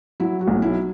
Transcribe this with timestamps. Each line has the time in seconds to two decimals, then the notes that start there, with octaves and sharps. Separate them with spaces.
0.20 F#3 E4
0.41 F#4
0.48 B1
0.62 E4